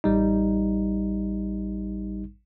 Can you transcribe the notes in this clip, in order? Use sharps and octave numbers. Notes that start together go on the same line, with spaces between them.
A1 G3 D#4